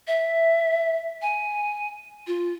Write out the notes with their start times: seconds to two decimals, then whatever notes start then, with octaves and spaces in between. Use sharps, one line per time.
0.07 E5
1.22 G#5
2.27 F4